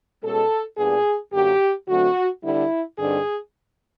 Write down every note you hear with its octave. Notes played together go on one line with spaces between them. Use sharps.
B2 G#3 C#4 A4
A#2 G3 B3 D4 G#4
F#2 D3 F#3 A#3 G4
D3 F#3 A3 C4 F#4
D3 G3 B3 D4 E4
G2 D3 G3 C4 D#4 G#4